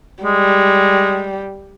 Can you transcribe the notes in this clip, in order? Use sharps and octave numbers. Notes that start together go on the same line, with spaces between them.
G3 G#3